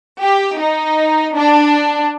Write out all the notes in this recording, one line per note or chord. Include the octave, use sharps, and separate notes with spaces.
G4
D#4
D4